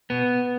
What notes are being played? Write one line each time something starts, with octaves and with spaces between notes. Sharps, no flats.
B2 B3